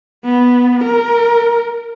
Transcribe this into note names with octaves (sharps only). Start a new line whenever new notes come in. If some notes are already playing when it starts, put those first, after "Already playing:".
B3
A#4